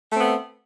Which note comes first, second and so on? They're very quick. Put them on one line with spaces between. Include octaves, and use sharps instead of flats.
A3 C4 B3